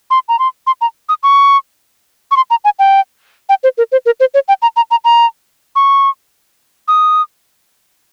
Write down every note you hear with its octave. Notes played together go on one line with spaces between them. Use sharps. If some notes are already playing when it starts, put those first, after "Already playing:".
C6
A#5
C6
C6
A#5
D#6
C#6
C#6
C6
A#5
G#5
G5
G5
C5
A#4
C5
A#4
C5
C#5
G5
A#5
A#5
A#5
A#5
C#6
D#6